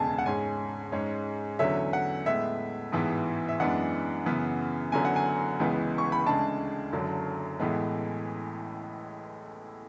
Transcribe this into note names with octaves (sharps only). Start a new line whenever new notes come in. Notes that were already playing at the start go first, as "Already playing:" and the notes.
Already playing: E1 D2 C#3 G#3 B3 G#5 A5
F#5
G#2 G#3 C#4 G#5
G#2 G#3 C#4
E2 D3 F#3 C#4 E5
F#5
A2 G#3 B3 E5
A1 G#2 E3 B3
E5
F#2 E3 G#3 B3 D4 F#5
F#2 C#3 E3 B3
F#1 F#2 D3 F#3 B3 G#5
F#5
G#5
C#2 C#3 E3 G#3 B3
C#6
B5
D2 C#3 G#3 D4 A5
F#1 F#2 D3 F#3
A1 A2 E3 G#3 B3